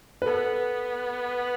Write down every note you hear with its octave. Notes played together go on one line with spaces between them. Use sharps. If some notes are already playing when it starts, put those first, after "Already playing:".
B4
B3 A4